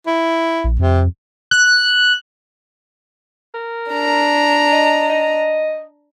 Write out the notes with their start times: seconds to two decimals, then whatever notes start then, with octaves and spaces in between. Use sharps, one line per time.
0.07 E4
0.64 A#1
0.79 F2 C3
1.51 F#6
3.54 A#4
3.92 D4 A#5
4.72 D#5
5.10 D#5